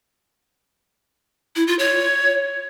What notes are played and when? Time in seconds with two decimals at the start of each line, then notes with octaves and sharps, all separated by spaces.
1.56 E4
1.67 F4
1.79 C#5